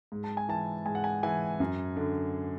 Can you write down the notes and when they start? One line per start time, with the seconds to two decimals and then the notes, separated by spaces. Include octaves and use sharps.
0.12 G#2
0.24 A5
0.37 G#5
0.49 E3 A5
0.86 G#2 G#5
0.95 F#5
1.04 G#5
1.23 E3 G#5
1.60 F#2
1.97 D3